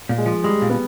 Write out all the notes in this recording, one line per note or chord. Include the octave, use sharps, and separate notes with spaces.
A#2
G#3
F3
G3 G#3
A#2
B3